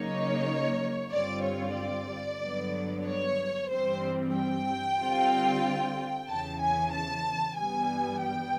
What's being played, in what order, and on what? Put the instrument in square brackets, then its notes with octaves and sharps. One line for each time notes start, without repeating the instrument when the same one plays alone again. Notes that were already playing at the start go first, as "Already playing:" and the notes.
Already playing: [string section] C#3 F#3 A#3 D#4 C#5
G2 D3 G3 C4 F4 D5
C#5
D5
G2 D3 F#3 B3
C#5
G2 E3 G3 C4 C5
G5
D3 G3 C4 F4
E2 C#3 E3 A5
G#5
A5
G2 E3 G3 B3 G#5
G5